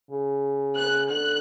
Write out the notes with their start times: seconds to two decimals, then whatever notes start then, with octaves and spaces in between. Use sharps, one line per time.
0.11 C#3
0.77 F#6
1.10 D3 F#6